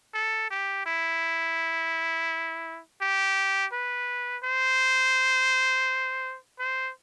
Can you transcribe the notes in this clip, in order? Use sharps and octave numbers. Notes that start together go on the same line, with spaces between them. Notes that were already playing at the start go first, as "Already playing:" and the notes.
A4
G4
E4
G4
B4
C5
C5